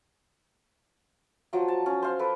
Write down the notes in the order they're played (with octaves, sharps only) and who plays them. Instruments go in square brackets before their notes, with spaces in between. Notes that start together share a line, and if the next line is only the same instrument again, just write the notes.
[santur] F3 F#3
A5
C#4
C5 F5
A4 B4 D6